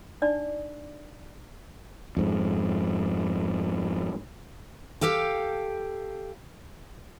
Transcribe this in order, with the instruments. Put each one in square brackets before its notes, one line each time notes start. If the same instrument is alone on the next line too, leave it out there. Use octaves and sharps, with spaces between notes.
[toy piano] D4 D#4 D5
[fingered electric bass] F2 G#2
[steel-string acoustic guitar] G4 A4 F5 G5